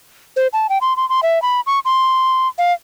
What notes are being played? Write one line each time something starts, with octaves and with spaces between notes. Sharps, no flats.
C5
A5
G5
C6
C6
C6
E5
B5
C#6
C6
F5